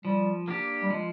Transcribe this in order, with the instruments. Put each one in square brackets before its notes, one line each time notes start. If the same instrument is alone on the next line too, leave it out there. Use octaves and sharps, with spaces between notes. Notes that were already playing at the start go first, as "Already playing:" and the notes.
[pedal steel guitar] F3 [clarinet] G3
[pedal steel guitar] A#3 D4 G4
[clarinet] G3
[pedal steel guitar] F3 [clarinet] G#3